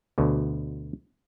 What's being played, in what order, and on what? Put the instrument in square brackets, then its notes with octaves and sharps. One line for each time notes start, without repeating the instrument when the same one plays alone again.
[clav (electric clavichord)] D2 B2 D3